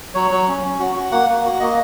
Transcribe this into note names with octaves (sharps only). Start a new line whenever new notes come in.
F#3 C#5
F#3
C#4
C#4
F#4
F#4
A#3 F#5
A#3
F#4
A#3 D#5